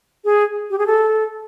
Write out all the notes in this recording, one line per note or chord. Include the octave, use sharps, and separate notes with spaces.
G#4
G4
G#4
A4